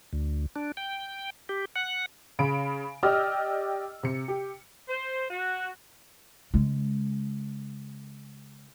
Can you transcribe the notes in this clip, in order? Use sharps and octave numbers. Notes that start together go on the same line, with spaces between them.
D2
D4
G5
G4
F#5
C#3 B5 D7
G4 D5 D#5 G5 E6 F6
C3 C#7
G4
C5
F#4
C#3 G#3